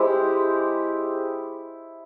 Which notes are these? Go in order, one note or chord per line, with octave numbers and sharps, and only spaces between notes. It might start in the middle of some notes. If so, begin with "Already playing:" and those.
Already playing: G#3 E4 G4 C5